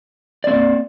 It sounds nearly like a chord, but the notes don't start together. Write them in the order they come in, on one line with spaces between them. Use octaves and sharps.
D5 C4 A#3